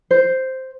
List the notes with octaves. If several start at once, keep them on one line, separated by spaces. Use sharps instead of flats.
C5